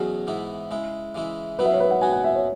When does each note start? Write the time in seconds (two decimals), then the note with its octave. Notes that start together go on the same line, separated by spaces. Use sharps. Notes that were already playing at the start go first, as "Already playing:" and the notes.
Already playing: E2 B2 F#3 C#4 F#4 G#4
0.27 G#2 E3 B3 E4
0.71 C#3 G#3 E4
1.15 C#3 E3 G#3 E4
1.59 C#3 F#3 B3 E4 B4
1.66 E5
1.73 C#5
1.80 B4
1.91 F#5
2.02 B2 B3 F#4 G#5
2.12 F#5
2.24 E5
2.35 C#5